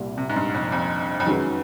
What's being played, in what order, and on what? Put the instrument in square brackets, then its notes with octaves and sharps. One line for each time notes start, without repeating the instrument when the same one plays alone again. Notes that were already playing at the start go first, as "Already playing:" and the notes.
Already playing: [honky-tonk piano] C2 A#2 G3
[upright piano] C3
G#2
G2
F2
F2
F2
[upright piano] F#2 [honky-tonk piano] D#3 G#3 C#4 F#4 B4